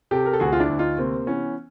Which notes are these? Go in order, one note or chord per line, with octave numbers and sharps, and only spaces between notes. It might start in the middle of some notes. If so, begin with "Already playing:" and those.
C3 G4 A4
A#4
A4
D2 F#4 G#4
F4
D4 E4
D2
D#4 F4
C3 A#3 C4
E3 B3 C#4